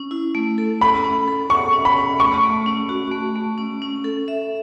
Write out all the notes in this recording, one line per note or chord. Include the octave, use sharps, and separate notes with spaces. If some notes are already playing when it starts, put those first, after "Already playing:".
Already playing: C#4
E4
A3
A4
C#4 B5
C#4
A4
F#5 C#6
C#4
B5
C#4
A3 C#6
A3
C#4
F#4
A3
A3
C#4
C#4
A4
E5